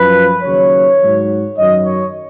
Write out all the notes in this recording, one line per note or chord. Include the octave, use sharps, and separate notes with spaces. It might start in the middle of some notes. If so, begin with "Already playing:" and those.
Already playing: F#2 F3 B4
D#2 C#3 F#3 C#5
G#2 F#3
F#2 D#3 F#3 D#5
C#5